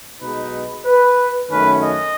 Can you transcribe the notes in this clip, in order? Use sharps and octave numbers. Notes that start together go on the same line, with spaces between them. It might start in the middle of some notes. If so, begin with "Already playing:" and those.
B1 B2 G#3 D#4 B4
B4
F#2 D#3 A3 C#4 B4
D#5